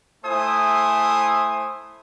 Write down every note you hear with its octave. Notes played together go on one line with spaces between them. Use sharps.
A3 E4 C5 G#5 D#6